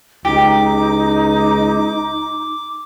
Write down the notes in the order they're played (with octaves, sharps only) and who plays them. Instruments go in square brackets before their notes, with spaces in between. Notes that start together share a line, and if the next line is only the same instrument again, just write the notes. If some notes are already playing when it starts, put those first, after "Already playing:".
[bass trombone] C#2 [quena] D#4 [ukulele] G4 [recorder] D6